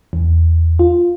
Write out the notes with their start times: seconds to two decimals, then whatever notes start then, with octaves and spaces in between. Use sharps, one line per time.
0.13 E2
0.79 F4